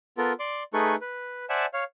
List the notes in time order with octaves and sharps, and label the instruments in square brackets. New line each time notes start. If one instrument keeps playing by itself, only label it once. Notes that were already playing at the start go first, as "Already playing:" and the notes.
[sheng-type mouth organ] B3 F4 A4 A#4
D5 C6 D6
A3 D#4 G#4 A4 B4 C#6
B4
C5 D5 E5 F#5 G#5 A5
C#5 F5